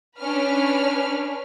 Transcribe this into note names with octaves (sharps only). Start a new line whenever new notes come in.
C#4 D4 B4 F6